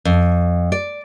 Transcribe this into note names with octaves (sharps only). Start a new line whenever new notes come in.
F2
D5